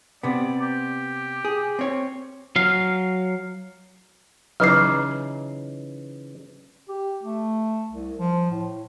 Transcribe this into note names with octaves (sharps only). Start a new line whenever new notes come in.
C3 B3 D5
G4
G#4
C4 C#5
F#3 F5
C#3 E3 F#3 D#4 B4 D6 F6 C7
G4
A3
C2
F3
A2